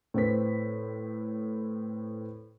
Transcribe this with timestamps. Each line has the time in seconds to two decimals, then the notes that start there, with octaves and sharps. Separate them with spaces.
0.14 A2 C4 B4 B6